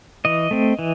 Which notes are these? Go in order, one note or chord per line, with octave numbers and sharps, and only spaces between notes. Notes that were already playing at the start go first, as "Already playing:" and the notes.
E3 D#5
A3 C4
E3